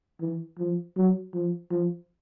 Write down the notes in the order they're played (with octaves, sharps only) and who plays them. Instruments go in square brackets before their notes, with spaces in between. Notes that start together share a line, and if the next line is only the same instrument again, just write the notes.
[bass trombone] E3
F3
F#3
F3
F3